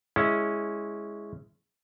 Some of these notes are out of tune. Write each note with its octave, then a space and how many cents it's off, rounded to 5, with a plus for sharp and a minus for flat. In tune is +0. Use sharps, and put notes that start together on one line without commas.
G#3 +0 C#4 +0 E4 +0